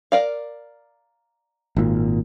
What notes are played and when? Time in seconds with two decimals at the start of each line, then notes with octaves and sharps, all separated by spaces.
0.12 A#4 D5 F5
1.76 G#1 A#2